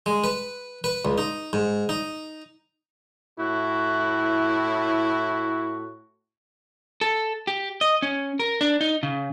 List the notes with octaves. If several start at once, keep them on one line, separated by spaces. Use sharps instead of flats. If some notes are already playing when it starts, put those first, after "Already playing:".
G#3
B4
B4
C#2
D#4
G#2
D#4
A2 E4 F#4
A4
G4
D#5
C#4
A#4
D4
D#4
C#3